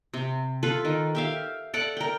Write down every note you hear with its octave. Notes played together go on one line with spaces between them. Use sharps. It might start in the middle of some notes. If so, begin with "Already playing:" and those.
C3
F4 A4 B4
D#3
G4 E5 F5
A4 D5 F#5 B5
A#4 G5